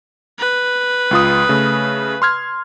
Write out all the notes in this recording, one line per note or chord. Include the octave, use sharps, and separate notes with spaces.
B4
C#2 F4 D#6
C#3 A3
C6 F6 G#6